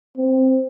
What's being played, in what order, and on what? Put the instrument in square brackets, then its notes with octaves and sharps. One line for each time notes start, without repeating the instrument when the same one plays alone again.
[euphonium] C4